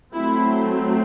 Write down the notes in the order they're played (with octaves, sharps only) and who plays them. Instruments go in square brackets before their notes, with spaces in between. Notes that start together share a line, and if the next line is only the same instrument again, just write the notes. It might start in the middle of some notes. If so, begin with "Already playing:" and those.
[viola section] F#3 A3 C4 E4